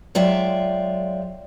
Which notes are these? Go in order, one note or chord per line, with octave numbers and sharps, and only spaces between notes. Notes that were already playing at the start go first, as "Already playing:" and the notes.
F#3 G#3 F4 D5 E5 G5